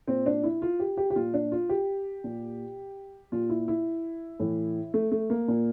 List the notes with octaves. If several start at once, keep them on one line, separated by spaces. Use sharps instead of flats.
A#2 C4
D4
E4
F4
G4
G4
G4
A#2 F4
D4
F4
G4
A#2
A#2 F4
E4
E4
A2 E3
A3
A3
A#3
A#2